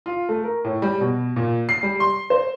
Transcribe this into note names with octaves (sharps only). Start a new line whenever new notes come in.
F4
A3
A#4
A2
G3
B2
A#2
C7
G3
C6
C5